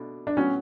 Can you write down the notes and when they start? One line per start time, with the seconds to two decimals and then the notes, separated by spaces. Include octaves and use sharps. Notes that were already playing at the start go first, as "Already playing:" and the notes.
Already playing: B2 A3 D4
0.27 D4
0.37 A2 F#3 B3 C#4